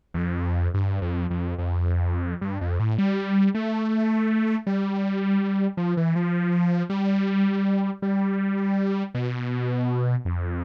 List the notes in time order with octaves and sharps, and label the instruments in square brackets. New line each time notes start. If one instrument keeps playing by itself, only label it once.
[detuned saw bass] E2
F2
G2
F2
F2
F2
G2
F2
A2
G3
A3
G3
F3
E3
F3
G3
G3
B2
F2